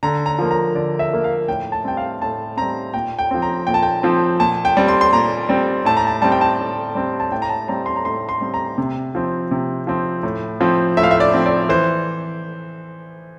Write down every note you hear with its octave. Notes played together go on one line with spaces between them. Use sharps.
D3 A#5
A#5
F3 A#3
A#5
D3 D5
E5
F3 A#3
F5
A2 G5
A5
G3 C4 G5
F5
A2 A5
G3 C4 A#5
A#2 G5
G5
F3 C4
A#5
A#2 G5
A5
G5
F3 C4
A#2 A5
G5
G3 C4
C6
C6
A#2 A#5
G3 C4
A2 A5
A#5
A5
G3 C4 A5
G5
A5
A2
G3 C4
A5
A2 G5
A#5
A5
G3 C4 A#5
C6
A#5
A2 C6
C6
G3 C4
A#5
C3
F3 C4
C3
F3 C4
A2
F3 C4
A2 E5
F5
E5
D5
F3 C4
D5
E3 C5